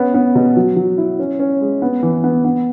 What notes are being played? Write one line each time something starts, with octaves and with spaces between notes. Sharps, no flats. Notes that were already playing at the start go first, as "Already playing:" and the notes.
Already playing: B3 C#4
B3
B2
F#3
F#3
E4
C#4
C#4
G#3
B3
E3
B3
B3